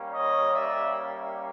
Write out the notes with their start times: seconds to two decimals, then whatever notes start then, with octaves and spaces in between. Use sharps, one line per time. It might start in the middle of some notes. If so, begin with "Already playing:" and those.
Already playing: G3 A#3 C#4
0.13 C#5 D#5
0.54 D5 E5